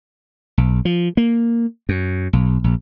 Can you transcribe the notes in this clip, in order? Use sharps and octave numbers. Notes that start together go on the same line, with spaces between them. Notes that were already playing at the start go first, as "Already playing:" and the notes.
B1
F3
A#3
F#2
B1
A#1